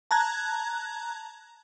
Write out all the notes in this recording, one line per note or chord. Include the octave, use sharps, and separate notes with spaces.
A5 A#5 F#6 G#6